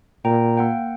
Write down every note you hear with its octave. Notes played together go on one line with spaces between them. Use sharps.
A#2 G5 A#5
A#3 F#5 G5